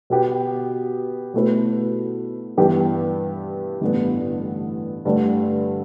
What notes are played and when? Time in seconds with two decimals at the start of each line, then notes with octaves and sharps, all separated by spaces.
0.10 B2 B3 G4
1.34 B2 A3 E4 B4
2.57 G2 E3 B3 G4
3.81 A1 G2 D3 B3
5.05 G2 D3 A3 G4